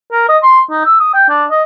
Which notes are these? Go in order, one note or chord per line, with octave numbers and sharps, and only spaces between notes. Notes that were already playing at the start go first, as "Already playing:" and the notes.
A#4
D#5
C6
D#4
E6
D#6
G5
D4
D#5